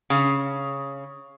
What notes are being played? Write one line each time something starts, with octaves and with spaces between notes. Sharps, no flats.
C#3